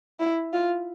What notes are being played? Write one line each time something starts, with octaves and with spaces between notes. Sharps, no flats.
E4
F4